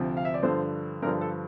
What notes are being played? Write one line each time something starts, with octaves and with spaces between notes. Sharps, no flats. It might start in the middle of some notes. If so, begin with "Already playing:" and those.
Already playing: D2 C3 F3
F5
E5
D5
G2 D3 F3 C5
G2 D3 F3 A#4
A4